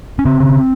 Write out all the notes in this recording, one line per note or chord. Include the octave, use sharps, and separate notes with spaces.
C#4
C#3 C4
C#3